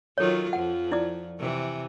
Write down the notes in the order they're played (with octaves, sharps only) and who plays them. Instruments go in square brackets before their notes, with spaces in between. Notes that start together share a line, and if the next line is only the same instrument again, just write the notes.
[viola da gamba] D#3 F#3 F4 [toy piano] A4 C#5
[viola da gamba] F2 F3 [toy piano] F#5
[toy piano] E4 D5 D6
[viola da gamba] C3 E3